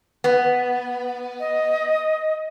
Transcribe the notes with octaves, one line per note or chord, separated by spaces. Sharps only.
B3
D#5